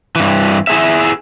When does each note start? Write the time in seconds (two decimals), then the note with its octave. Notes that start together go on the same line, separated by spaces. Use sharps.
0.16 G2 E3
0.67 E4 G#4 E5